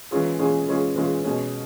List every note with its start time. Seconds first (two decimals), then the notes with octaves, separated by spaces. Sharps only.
0.11 E3 G#3 C#4 F4 G#4
0.39 E3 G#3 C#4 F4 G#4
0.67 E3 G#3 C#4 F4 G#4
0.95 E3 G#3 C#4 F4 G#4
1.24 B2 G#3 C#4